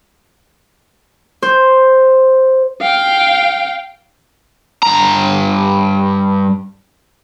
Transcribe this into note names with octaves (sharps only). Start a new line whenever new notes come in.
C5
F5 G5
G2 A#5